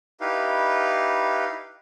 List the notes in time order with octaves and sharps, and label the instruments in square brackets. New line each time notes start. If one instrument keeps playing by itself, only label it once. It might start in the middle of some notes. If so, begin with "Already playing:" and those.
[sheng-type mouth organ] D#4 E4 G4 B4 F5